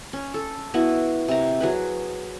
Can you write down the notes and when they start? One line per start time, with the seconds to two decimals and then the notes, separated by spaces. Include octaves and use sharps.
0.13 C#4
0.34 A4
0.74 B3 E4 F#4
1.28 C3 A#5
1.60 F#3 G#4 B4